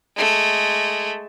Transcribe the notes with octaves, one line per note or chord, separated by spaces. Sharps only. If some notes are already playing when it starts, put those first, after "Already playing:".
G#3 A3